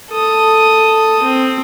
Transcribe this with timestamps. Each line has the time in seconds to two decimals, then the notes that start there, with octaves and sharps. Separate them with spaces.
0.11 A4 D#6
1.23 C4